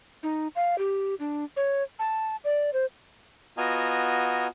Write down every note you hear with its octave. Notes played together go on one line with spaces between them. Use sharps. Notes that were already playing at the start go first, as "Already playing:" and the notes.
D#4
F5
G4
D4
C#5
A5
D5
C5
B3 F4 F#4 D#5 G#5 A#5